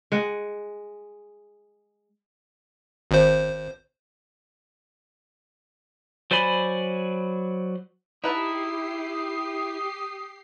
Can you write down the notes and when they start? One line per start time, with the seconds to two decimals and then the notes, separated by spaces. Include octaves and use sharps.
0.12 G#3 F#5
3.11 G#1 C5
6.31 F#3 C5 D5 G#5 B5
8.24 D#4 E4 G4 B4 A5 D#6 C7